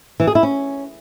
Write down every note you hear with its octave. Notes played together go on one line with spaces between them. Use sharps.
E3
G#4
E4
C#4